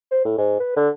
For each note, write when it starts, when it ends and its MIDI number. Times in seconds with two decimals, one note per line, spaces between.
0.11 0.20 72
0.25 0.34 45
0.38 0.58 44
0.60 0.72 71
0.76 0.89 50